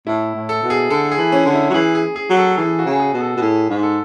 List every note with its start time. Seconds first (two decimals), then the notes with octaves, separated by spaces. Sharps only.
0.07 A2 E4
0.35 A2
0.49 A4
0.63 B2
0.70 G#4
0.90 D3 A4
1.12 G#4
1.18 E3
1.32 C#4
1.46 D3
1.53 E4
1.70 F#3
1.74 E3 G#4
1.95 G#4
2.16 G#4
2.30 F#3
2.37 A4
2.58 E3 G#4
2.79 F#4
2.86 C#3
3.00 G#4
3.13 B2
3.20 A4
3.37 B2
3.41 A2 G#4
3.70 G#2
3.83 A4